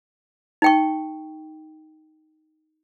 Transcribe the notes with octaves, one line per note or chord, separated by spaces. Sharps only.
D#4 G5 C#6